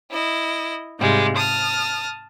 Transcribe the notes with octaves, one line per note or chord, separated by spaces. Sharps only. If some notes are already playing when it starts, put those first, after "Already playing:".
E4 D#5
G#2 C3 G3 G#3 F4
A5 D#6 F6